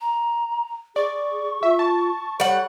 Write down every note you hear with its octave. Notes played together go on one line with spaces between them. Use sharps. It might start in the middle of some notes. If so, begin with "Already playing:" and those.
A#5
G#4 D5 C#6
F4 E5
A5
G3 C#5 F#5